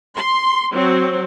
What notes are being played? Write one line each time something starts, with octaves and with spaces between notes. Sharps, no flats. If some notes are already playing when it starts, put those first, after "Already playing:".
C6
F#3 C4